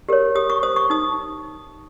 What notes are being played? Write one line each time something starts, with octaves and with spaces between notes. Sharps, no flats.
G4 A#4 C#5
G4 D#6
C#6
C5 D#6
C#6
D#4 D#6